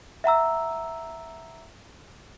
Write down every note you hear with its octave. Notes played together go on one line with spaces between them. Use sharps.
E5 F#5 A#5 E6